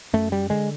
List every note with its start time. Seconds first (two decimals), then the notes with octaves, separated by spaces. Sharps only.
0.13 F#2 A3
0.32 G3
0.50 D3 G#3